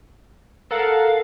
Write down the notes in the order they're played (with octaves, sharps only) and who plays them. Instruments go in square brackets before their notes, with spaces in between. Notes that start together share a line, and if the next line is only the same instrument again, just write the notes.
[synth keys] A4 A#4 F#5 [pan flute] F5